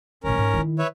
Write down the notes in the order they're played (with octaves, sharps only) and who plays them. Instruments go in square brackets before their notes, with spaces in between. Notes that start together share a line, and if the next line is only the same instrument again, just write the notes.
[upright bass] A1 D#3 [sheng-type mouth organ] C#4 A#4
[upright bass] G#2
D#3 E4
[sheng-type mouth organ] B4 C#5 E5